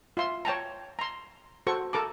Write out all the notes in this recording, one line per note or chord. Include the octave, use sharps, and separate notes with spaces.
F4 E5 C6
C#5 G5 A5 A#5
A#5 C6
F#4 A4 C5 C#6
A4 A#4 A5 D6